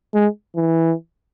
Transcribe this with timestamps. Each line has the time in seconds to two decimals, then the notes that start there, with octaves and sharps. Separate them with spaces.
0.14 G#3
0.56 E3